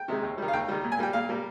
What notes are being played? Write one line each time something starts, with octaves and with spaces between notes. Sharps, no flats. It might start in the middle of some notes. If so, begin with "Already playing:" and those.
Already playing: G5
C3 D#3 G#3
D#2
D#3 G3
F5
D#2 G5
D#3 G3
A#2
G#5
G3 A#3 G5
A#2 F5
G3 A#3